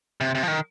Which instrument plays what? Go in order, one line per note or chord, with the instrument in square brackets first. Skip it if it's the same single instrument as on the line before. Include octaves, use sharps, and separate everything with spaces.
[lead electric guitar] C3
C3
F3
D#3